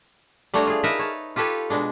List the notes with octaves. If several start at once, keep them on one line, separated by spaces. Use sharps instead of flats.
G3 A3 A#3 D4 C#5 A#5
F4 G#4
D#4 A#4 B4 E5
C#5 A5
F4 G4 A4 B4 C#5
B2 G#3 D4